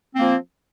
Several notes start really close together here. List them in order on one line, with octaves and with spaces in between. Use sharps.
C4 A#3 F3